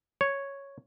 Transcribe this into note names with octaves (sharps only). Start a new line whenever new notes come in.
C#5